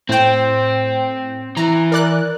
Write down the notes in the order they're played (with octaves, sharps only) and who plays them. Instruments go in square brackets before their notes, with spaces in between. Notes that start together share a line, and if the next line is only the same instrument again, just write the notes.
[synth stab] A2 G5 [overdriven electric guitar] C4
[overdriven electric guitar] E3 [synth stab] A#5
[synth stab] A#4 D5 F#6